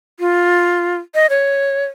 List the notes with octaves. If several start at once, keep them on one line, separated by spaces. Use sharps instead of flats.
F4
D#5
C#5